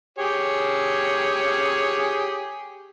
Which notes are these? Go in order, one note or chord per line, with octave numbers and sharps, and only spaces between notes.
G4 G#4 C#5